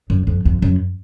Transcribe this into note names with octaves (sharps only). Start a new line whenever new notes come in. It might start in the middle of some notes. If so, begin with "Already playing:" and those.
F#2
F2
F2
F#2